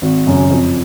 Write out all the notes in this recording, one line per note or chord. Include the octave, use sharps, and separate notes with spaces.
G#1
F#2 C#3
F2